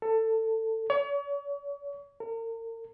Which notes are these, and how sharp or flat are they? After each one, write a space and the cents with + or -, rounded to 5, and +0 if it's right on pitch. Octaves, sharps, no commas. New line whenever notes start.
A4 +20
C#5 +40
A#4 -40